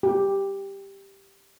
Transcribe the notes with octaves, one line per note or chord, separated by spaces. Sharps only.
G4